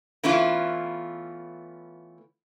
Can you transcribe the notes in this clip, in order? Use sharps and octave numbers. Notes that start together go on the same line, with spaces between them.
E3 A3 B3 C#4 E4 F4